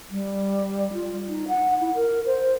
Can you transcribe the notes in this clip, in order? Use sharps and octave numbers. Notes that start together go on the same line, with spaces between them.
G3
F4
D#4
F#5
E4
A#4
C5